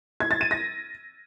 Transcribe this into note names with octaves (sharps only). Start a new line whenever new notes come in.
G#6
A6
D#7
A#6